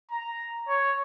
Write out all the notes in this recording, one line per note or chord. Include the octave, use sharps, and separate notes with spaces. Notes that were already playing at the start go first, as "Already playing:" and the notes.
A#5
C#5